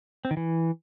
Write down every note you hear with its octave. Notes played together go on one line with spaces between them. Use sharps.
C4
D#3
E3